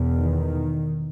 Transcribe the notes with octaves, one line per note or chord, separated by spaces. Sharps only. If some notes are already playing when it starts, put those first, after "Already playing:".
Already playing: E2 B2
D#3